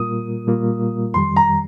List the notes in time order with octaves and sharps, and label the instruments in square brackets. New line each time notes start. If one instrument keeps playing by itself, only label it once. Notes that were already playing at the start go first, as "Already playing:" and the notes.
Already playing: [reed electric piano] A#2 G3 A#3 F4 A#4 [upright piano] D#6
[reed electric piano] A#2 G3 A#3 F4 A#4
[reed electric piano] F2 D#3 G3 [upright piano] C6
[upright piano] A#5